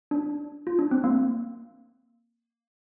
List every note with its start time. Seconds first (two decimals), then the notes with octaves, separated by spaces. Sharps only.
0.11 D4
0.67 F4
0.79 D4
0.91 C4
1.04 A#3